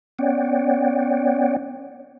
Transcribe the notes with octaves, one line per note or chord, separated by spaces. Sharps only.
B3 C#4 C#5 D5 F#5 G5